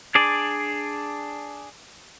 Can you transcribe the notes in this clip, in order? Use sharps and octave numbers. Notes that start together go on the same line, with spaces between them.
D4 G#4 D5